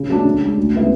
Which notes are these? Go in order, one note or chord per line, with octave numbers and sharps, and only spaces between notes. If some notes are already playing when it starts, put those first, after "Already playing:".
Already playing: C#3
F#3 A3 D4
C#3
G#3 D4
D2
C#3 G#3 B3 E4